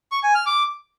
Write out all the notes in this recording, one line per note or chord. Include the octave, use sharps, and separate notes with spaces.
C#6
G#5
F6
D6